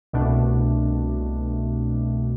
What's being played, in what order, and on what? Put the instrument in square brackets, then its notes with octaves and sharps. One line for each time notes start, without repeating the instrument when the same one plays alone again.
[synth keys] C2 B2 A3 D4